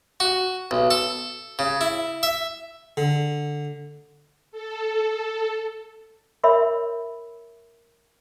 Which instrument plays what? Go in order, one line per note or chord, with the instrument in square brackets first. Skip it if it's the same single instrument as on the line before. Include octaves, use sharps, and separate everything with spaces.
[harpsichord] F#4
B1
A4
C#3
E4
E5
D3
[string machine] A4
[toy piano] A#4 C#5 E5 B5